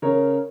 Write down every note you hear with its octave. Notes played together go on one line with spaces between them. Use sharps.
C#3 A#4 C#5